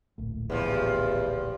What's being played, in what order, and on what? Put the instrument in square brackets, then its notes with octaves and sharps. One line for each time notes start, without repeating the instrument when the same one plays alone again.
[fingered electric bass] D1 A#1 A2
[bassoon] E2 [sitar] G2 F3